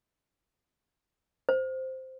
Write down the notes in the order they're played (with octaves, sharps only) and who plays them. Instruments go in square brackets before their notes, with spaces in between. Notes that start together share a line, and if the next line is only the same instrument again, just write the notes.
[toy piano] C5